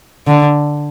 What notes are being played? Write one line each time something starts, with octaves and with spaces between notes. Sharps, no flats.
D3